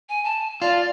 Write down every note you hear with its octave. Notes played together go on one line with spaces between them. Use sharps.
G#5
A5
F4 D5